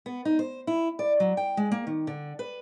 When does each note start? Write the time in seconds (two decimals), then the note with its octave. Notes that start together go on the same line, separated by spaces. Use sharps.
0.06 B3
0.25 D#4
0.39 C5
0.67 E4
0.99 D5
1.20 F#3
1.37 G5
1.57 G#3
1.72 A#3
1.87 D#3
2.07 D3
2.39 B4